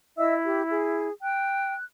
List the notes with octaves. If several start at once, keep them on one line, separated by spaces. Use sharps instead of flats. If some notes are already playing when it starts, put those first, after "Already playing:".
E4 D#5 E5 E6
G4
G#4
G5 F#6